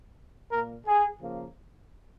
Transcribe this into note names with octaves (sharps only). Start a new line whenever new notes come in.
A#2 A#3 A#4
G#4
C#3 F3 A#3